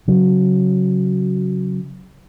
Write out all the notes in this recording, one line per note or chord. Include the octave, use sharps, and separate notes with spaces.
C#3 F#3